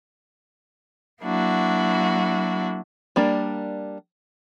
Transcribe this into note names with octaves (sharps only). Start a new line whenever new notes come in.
F#3 A#3 D4 E4 F#4
G3 A#3 D4